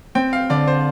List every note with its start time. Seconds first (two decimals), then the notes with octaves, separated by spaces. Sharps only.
0.15 C4 G5
0.33 F5
0.50 D3 D5
0.68 C5